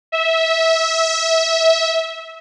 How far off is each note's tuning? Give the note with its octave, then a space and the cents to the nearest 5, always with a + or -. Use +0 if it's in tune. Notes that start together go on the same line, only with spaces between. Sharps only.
E5 -20